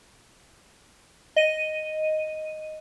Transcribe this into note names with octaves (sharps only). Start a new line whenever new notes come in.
D#5 D#7